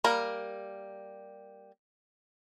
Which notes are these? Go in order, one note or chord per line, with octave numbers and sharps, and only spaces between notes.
G3 A#3 A#4